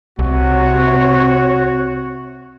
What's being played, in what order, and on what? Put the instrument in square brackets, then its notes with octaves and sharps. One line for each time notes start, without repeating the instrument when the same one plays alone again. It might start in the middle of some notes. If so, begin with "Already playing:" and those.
[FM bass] C2 [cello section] C3 C#5 [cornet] F#4